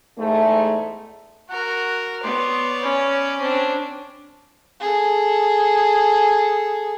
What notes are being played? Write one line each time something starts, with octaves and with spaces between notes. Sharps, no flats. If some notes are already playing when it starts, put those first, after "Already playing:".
E2 G#2 A3
F#4 A#4 F#5
B3 C#5 D5 C6
C#4 B5
C4 D4
G#4 A4